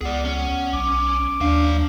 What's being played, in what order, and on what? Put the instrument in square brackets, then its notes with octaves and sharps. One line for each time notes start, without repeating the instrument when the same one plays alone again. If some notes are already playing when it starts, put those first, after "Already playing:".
[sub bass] C#2 [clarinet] B3 [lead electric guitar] G#4 D5
[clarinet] B3 [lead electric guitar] C#4
[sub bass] B1 [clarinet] D6
[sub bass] D#2 [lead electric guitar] F#3 F5 [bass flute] D4